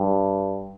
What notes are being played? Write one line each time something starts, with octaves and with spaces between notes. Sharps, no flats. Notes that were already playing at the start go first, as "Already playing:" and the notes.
Already playing: G2